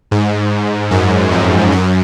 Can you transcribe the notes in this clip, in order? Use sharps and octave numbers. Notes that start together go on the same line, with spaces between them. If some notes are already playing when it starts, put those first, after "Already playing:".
G#2
F#2
F2
F#2